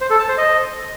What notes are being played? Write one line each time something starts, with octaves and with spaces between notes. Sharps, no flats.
C5
A4
A5
C5
D#5